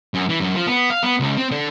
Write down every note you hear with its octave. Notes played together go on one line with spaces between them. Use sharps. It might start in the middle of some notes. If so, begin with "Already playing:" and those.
F#2
E3
F#2
F3
B3
F5
B3
C#2
C4
D3